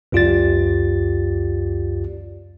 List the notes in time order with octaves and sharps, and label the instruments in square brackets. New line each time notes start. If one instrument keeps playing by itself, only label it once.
[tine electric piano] C#2 F#2 F4 G4 D5 A6